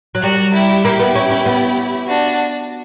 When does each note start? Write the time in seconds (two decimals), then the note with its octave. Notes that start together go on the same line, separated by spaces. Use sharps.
0.15 F#3
0.23 G3 F#4 A#4
0.54 E4 G4
0.85 A#3 E4 G4
1.00 B3
1.15 C#4
1.31 C#4
1.46 B3
2.08 D4 F#4